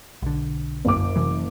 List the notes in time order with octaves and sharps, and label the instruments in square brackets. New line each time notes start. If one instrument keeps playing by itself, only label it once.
[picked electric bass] B1 D3
[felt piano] F#1 D6
[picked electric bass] C3 E3 F#3